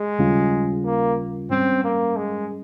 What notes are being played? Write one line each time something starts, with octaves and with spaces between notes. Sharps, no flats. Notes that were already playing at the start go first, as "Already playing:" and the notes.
Already playing: G#3
D#2 C#3 G3 C#4 F4
A#3
G#2 G3 C4 C#4
A#3
G#3